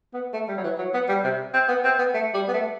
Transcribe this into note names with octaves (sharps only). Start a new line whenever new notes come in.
B3
A3
G3
F#3
E3
F#3
B3
G3
C3
C4
B3
C4
B3
A3
G3
B3
A3